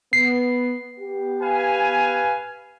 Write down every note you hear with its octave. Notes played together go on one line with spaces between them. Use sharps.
B3 C7
B3 G4
B4 F5 G#5